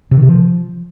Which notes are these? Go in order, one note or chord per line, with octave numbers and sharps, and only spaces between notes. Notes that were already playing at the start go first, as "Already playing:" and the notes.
C3
D#3
C3
F3